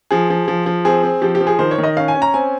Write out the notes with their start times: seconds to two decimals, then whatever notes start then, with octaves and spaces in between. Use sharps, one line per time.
0.11 F3 G#4
0.30 F3
0.48 F3
0.66 F3
0.85 C4 G#4
1.03 C4
1.22 F3 G4
1.35 G4
1.41 F3
1.47 G#4
1.59 D#3 C5
1.71 C#5
1.78 D#3
1.84 D#5
1.96 C#4 F5
2.08 G#5
2.15 C#4
2.22 A#5
2.34 C4 G#5